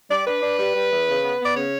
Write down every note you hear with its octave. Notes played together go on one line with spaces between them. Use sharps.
G3 D5
D4 B4
D4
G3
G3
E2
C#3
B3
B3
D5
C#3 C#5